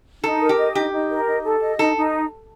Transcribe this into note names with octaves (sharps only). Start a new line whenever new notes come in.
D#4 A4
A#4
G4
D#5
D#4 G4
D#4
A#4
D#4
A4
D#5
D#4 A4
D#4